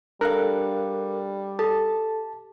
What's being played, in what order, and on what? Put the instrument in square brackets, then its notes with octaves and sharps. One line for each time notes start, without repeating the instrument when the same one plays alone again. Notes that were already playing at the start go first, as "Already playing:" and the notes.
[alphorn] G3 [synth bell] D4 A4 F5 [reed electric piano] A#4 F#6
[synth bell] G4 [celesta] A4 [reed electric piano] A5